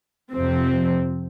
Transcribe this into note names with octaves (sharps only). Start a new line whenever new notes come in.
F2 C3 F3 C4